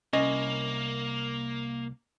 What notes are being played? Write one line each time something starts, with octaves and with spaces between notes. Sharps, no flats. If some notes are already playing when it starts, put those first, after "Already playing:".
C2 A#3 C#4 D#5